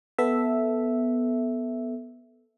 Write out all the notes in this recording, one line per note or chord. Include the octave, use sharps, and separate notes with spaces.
B3 A4 E5